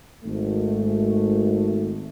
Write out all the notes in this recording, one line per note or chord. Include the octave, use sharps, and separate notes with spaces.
G#1 A3